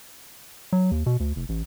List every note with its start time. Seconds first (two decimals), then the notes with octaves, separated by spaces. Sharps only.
0.73 F#3
0.91 D#2
1.06 B2
1.20 D2
1.36 F1
1.49 A1